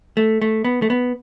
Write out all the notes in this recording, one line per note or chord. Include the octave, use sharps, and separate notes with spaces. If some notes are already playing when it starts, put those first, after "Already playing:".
A3
A3
B3
A3
B3